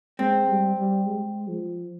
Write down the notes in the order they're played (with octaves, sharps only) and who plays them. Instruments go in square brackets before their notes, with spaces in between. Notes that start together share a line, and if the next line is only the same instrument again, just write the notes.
[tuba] G#3 [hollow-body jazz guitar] C4
[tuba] G3
G3
G#3
F3